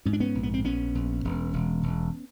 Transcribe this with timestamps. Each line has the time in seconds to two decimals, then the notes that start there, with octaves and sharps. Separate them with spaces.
0.05 G#2 C#4
0.13 D4
0.20 B3 C#4
0.35 A#1
0.43 B3
0.54 C4
0.64 A#1 B3 C#4
0.95 A#1
1.24 E1
1.53 E1
1.83 E1